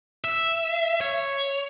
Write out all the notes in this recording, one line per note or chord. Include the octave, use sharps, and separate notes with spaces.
E5
C#5